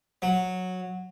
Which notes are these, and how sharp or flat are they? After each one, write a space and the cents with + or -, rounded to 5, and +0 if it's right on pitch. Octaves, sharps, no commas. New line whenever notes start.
F#3 -10